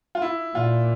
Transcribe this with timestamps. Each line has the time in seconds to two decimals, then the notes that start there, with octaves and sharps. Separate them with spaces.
0.15 F4
0.22 E4
0.55 A#2 F4